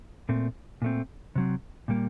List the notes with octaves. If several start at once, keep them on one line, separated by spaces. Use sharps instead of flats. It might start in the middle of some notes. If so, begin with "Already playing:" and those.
A#2 A3 C4
A#2 A3 C4
C3 F#3 C4
A#2 G3 A#3